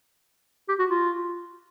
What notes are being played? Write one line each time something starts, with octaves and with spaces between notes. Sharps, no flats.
G4
F#4
F4